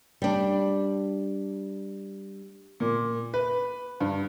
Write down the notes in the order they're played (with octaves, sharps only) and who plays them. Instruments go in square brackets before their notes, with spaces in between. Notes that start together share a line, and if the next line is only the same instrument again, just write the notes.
[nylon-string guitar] G3 D4
[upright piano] A#2
B4
G2